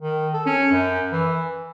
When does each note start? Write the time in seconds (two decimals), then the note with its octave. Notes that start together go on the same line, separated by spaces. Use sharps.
0.01 D#3
0.33 A4
0.46 C#4
0.72 F#2
1.12 E3